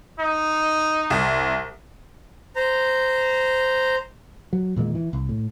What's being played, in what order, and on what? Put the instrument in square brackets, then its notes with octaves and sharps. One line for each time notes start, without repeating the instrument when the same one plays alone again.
[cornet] D#4
[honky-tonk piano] C2
[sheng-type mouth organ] C5 A#5
[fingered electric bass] F#3
E2 A#2 D#3 G#3
E3
C2
A2